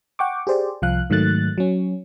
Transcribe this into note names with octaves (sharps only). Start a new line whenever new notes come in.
F#5 G5 C#6 D6
G4 G#4 C5 D5
C2 F3 F5 F#6
G#2 D#3 F#3 A3 F#6 A6
F#3 C#4